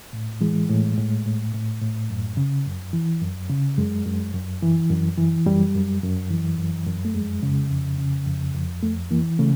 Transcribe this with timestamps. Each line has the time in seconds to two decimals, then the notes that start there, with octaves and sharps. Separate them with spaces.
0.13 A2
0.41 E3 G#3
0.70 A2
0.97 A2
1.25 A2
1.54 A2
1.82 A2
2.10 F#2
2.37 C#3
2.66 F#2
2.93 E3
3.22 F#2
3.50 C#3
3.78 F#2 G#3
4.06 F#2
4.34 F#2
4.62 E3
4.90 F#2
5.18 E3
5.46 F#2 G3
5.75 F#2
6.03 F#2
6.30 E3
6.58 F#2
6.87 F#2
7.05 A3
7.14 F2 G#3
7.43 C#3
7.71 F2
7.99 C#3
8.26 F2
8.54 F2
8.83 F2 A3
9.11 E3 A#3
9.39 C#3 A3